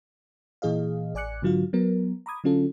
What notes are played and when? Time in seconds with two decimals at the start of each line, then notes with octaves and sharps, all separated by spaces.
0.62 A#2 E3 G#4 D#5 F5
1.14 A1 D5 G#5 D6 F#6 C#7
1.42 G#2 D3 F#3 F4 F#4 F5
1.73 F#3 B3 A#4
2.26 A#5 B5 D6 D#6 G#6
2.44 D3 F#3 C#4 F4 A4